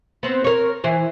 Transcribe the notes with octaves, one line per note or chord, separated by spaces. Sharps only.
B3 C4
A#4 C#5
E3 C5